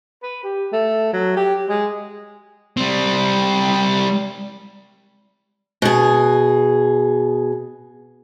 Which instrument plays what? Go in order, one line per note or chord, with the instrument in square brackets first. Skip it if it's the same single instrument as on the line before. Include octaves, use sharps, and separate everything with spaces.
[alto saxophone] B4
G4
A3
F#3
G4
G#3
[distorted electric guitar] G3 C4
[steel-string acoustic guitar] B2 G#4